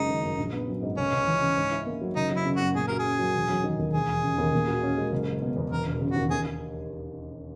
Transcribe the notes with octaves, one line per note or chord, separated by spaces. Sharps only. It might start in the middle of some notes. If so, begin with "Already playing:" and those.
Already playing: F#1 C#3 G#3 D#4
D#3
F#2
A#1
B3
F#3
G#2
C#2 C#4
C#2
E3
C#3
G#2
E4
A#3
F#3
F#1 D#4
F#3
E4
C#3
F#2 F#4
A#2 G#4
F#4 A#4
G#4
C#4
F#3
E1
F#3
D#3
D#2
E1 G#4
E1
C#3
D#2
A#2
F#4
C#4
G#3
F#1
G#3
B2
E2
E1 A#4
E1
C#3
D#2 F#4
D#2 G#4